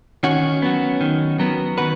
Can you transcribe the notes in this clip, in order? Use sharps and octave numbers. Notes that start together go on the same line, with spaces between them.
D#3 C#4 F#4
F#3 B3
D#3
F#3 B3
D#3 F#4 B4